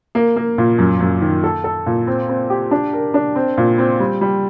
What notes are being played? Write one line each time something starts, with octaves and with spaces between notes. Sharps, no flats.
A#3
A#3
A#2
F#2
F#2
D#3
A4
A4
A#2
C4
C4
G4
D4
A#4
D4
C4
A#2
C4
G3
G3